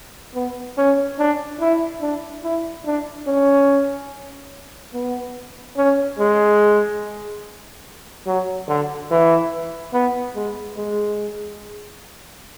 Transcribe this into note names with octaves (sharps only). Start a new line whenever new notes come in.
B3
C#4
D4
E4
D4
E4
D4
C#4
B3
C#4
G#3
F#3
D3
E3
B3
G#3
G#3